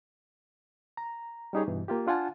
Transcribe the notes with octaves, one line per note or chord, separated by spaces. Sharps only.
A#5
G3 C#4 D#4 G4 G#4 C#5
G2 B2 E3
A#3 F4 G4
D4 F4 F#5 G#5 A5